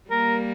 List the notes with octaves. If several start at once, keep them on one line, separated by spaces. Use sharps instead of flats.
G3 A#3 A#4